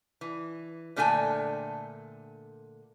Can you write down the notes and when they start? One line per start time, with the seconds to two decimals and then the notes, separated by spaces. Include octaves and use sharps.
0.21 E3
0.96 A#2 D3 A3 A4 G5 G#5